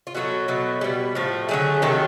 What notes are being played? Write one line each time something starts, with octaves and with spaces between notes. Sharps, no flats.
F4
B2 F#3 A3 F#4
B2 F#3 A3
B2 G3
A2 F3 A3
D3 F#3 A3 G#4
C3 D#3 F#3 A3 A4